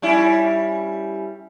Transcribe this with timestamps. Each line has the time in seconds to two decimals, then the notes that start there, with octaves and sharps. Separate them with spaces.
0.02 G3 C#4 E4